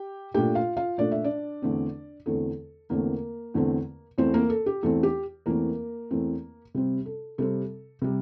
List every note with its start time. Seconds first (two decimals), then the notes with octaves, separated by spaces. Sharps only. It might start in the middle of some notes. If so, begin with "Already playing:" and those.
Already playing: G4 G5
0.34 A#2 A3 D4 G4 G5
0.55 F4 F5
0.77 F4 F5
0.98 A#2 A3 D4 D5
1.12 E5
1.24 D4 D5
1.62 E2 D3 A3 C4
2.26 E2 D3 A3 C4 A4
2.90 E2 D3 A3 A#3 C4 A#4
3.54 E2 D3 A3 C4
4.18 E2 E3 A3 C4 C5
4.34 A#3 A#4
4.50 A4
4.66 G4
4.83 E2 E3 A3 C4 A4
5.03 G4
5.46 E2 E3 A3 A#3 C4 A#4
6.10 E2 E3 A3 C4
6.74 C3 G3 C4
7.06 A4
7.38 C3 G3 C4 A4
8.02 C3 G3